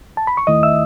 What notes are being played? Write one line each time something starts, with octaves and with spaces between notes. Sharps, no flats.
A5
B5
C#6
D#2 D#3 A3 E4 D#5 D#6
E5 E6